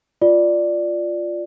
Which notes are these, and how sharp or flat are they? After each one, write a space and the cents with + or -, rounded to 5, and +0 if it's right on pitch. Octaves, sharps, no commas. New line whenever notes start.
F4 +0 D5 +5